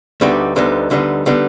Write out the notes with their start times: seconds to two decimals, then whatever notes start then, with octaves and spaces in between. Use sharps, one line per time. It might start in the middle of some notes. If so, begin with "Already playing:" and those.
0.21 D2 D3 G3 B3 D#4
0.56 D2 D3 G3 B3 D#4
0.90 D2 D3 G3 B3 D#4
1.26 D3 G3 B3 D#4